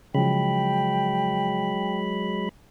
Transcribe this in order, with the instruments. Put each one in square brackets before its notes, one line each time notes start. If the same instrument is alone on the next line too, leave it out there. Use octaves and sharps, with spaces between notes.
[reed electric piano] C#3 F3 [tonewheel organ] F#3 G#3 B5 [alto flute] G5